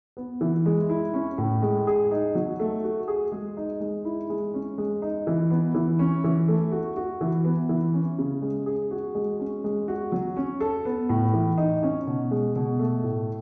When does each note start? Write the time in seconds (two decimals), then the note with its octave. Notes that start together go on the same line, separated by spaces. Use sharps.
0.17 B3
0.41 E3
0.66 G#3
0.89 E4
1.14 C#4
1.38 A2
1.62 G#3
1.87 G#4
2.11 D#4
2.35 F#3
2.60 A3
2.84 F#4
3.08 G#4
3.32 G#3
3.57 D#4
3.80 G#3
4.05 E4
4.30 G#3
4.54 C#4
4.78 G#3
5.02 D#4
5.27 E3
5.50 B3
5.75 E3
5.99 C#4
6.24 E3
6.48 A3
6.72 F#4
6.97 F#4
7.21 E3
7.45 B3
7.69 E3
7.94 C#4
8.19 C#3
8.42 G#3
8.66 G#4
8.91 F#4
9.15 G#3
9.40 C#4
9.64 G#3
9.88 F#4
10.12 F#3
10.37 C#4
10.61 A4
10.85 B3
11.09 A2
11.34 E3
11.58 D#4
11.83 C#4
12.07 B2
12.31 G#3
12.56 B2
12.79 A3
13.04 A2